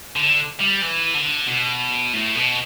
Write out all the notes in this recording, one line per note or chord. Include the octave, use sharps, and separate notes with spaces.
D3
G3
E3
D3
B2
A2
B2